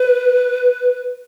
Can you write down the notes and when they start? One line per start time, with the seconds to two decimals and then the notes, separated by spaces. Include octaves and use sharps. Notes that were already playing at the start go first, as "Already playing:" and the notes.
Already playing: B4